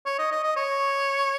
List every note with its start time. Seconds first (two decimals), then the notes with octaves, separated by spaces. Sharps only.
0.06 C#5
0.19 D#5
0.31 D#5
0.43 D#5
0.56 C#5